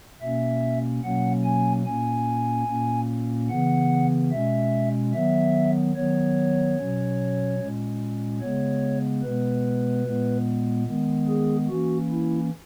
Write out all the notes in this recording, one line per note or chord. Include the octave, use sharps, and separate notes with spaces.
B2 A#3 C#4 E5
B2 F#3 A#3 C#4 F#5
G#5
A#2 A#3 C#4 G#5
A#2 A#3 C#4
C#3 E3 B3 F#5
B2 G#3 C#4 E5
D#3 F#3 B3 E5
D#3 F#3 B3 C#5
B2 F#3 C#4
A#2 G#3 C#4
C#3 G#3 B3 C#5
B2 G#3 B3 B4
A#2 G#3 B3
D#3 G#3 B3
G#4
E3 A#3 C#4 F#4
E4